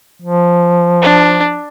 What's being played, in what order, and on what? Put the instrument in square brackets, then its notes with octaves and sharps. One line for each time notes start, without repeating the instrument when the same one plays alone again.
[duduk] F3
[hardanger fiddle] D4